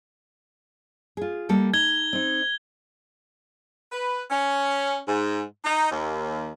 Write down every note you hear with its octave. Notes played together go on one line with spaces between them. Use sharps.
F4 G#4
G3 A#3 A4
D#4 G#6 G7
C4 D#4
B4
C#4
G#2
D#4
D#2